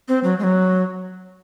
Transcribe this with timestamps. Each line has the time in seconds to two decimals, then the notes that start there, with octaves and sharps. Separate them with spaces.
0.08 C4
0.24 F#3
0.39 G#3
0.44 F#3